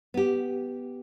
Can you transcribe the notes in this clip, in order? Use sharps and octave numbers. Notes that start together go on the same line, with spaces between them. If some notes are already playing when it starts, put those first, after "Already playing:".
B3 G4